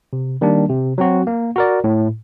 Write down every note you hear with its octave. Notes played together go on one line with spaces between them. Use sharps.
C3
D#3 G3 A#3 D4
C3
F#3 C4 F#4
A#3
F#4 A#4 D5
A2